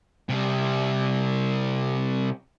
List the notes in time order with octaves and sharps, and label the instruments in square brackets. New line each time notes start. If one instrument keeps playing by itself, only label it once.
[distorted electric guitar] C3 G3